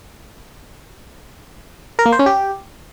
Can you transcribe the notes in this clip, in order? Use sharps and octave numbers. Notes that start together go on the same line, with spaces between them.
A#4
A#3
C5
C#4
G4